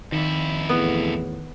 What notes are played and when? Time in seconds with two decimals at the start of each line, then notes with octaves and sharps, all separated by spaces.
0.12 F2 D#3 E4
0.69 E2 A2 B3